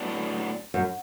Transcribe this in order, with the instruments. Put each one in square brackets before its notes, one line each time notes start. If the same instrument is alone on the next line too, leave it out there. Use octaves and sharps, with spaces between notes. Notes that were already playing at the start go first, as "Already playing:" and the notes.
Already playing: [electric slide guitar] A2 F#3 B3 D4
[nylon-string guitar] F#2